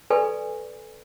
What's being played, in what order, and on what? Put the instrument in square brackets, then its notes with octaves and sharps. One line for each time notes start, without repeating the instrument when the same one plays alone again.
[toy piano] A4 B4 D5 G#5 B5 C#6